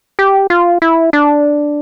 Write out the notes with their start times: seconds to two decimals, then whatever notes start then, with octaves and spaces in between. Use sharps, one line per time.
0.19 G4
0.50 F4
0.82 E4
1.13 D4